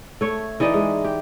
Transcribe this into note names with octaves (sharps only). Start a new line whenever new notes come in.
A3 C#5
E3 D#4 D5 D#5
G#3
G4